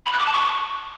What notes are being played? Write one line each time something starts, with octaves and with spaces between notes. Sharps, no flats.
B5
F#6
D6
A5
C#6